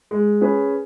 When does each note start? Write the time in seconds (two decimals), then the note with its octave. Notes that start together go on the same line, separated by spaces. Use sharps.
0.11 G#3
0.41 C#4 G#4 B4